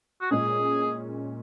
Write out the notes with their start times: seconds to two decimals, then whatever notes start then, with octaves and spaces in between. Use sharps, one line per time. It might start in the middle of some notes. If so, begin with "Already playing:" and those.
0.21 F#4
0.31 A#2 G#3 C#4 G#4